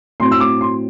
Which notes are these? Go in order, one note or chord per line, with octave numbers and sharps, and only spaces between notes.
A2 F#3 C4 C6
E6
D6
C6